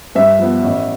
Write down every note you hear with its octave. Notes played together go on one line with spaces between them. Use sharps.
G2 E5
F3 B3
A1